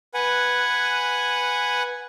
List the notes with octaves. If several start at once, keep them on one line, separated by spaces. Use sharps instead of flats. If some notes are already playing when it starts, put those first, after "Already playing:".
B4 F#5 G#5